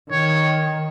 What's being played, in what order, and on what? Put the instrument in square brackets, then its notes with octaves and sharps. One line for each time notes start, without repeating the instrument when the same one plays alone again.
[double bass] D#3 [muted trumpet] C#5